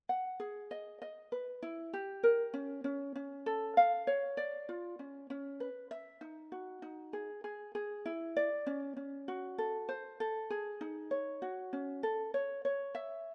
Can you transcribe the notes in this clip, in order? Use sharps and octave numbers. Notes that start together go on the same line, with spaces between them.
F#5
G#4
D#5
D#5
B4
E4
G4
A#4
C#4
C#4
C#4
A4
F5
C#5
D5
F4
C#4
C#4
B4
E5
D#4
F#4
D#4
G#4
G#4
G#4
E4
D5
C#4
C#4
F#4
A4
C5
A4
G#4
D#4
C#5
F#4
C#4
A4
C#5
C#5
E5